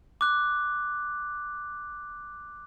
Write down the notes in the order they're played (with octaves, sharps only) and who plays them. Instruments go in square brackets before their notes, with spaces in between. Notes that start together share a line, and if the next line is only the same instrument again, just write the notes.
[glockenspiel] D6 F#6